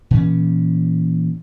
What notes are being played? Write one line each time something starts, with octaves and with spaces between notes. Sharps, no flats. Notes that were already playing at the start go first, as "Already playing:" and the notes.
A#2 E3 C#4